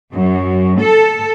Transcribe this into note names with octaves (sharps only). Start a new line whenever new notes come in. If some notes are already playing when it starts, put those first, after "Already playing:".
F#2
A4